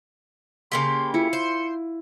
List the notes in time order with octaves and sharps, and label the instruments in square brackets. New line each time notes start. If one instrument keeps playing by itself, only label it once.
[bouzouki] C#3 A#3 G4 [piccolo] C6
[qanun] E4 F4 [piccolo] C#7
[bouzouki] C5